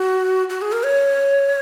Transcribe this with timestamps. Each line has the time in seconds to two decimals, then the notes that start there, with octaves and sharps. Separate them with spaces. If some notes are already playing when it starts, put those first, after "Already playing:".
Already playing: F#4
0.50 F#4
0.62 G#4
0.72 A#4
0.83 C#5